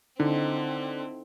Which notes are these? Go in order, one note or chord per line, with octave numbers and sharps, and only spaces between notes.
D3 C4 D#4 E4 A4